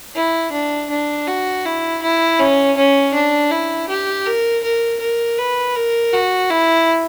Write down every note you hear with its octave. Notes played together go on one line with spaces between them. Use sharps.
E4
D4
D4
F#4
E4
E4
C#4
C#4
D4
E4
G4
A#4
A#4
A#4
B4
A#4
F#4
E4